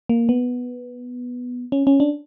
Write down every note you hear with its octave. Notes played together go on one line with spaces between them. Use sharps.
A#3
B3
C#4
C#4
D4